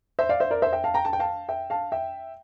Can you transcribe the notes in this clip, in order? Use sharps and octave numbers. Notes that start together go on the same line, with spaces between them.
C5 E5
D5 F5
C5 E5
A#4 D5
C5 E5
E5 G5
F5 A5
G5 A#5
A5
G5
F5 A5
E5 G5
F5 A5
E5 G5